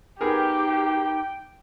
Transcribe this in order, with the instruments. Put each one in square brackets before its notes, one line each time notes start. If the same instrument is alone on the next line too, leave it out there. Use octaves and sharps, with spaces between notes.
[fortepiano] B3 G#4 A#4 [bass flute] D#4 [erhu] G4 [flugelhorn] G5